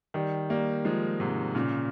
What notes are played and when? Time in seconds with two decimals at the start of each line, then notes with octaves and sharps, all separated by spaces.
0.14 D#3 G3
0.50 G3 A#3
0.85 F3 G#3
1.20 G#2 C3
1.55 A#2 C#3